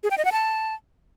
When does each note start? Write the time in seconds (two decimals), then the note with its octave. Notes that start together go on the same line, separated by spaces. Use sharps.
0.03 G#4
0.11 G5
0.18 D#5
0.25 F#5
0.32 A5